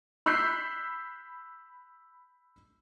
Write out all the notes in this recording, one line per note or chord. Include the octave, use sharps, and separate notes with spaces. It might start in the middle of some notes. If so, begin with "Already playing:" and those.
B5 E6 F#6 G6 B6 C7